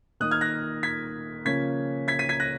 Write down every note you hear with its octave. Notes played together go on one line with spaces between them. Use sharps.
D#3 A#3 D#4 D#6 F#6
F6 G#6
F#6 A#6
G#6 B6
C#3 F3 A#3 C#4 G#6 B6
G#6 B6
B6 D#7
G#6 B6
F#6 A#6